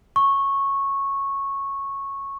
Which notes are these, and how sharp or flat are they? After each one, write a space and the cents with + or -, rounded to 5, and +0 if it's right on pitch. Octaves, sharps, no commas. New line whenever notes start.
C#6 -10